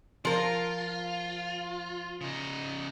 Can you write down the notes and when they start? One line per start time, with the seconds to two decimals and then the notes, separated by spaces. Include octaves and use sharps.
0.25 F3 F4 A#4
2.21 C#3 D#4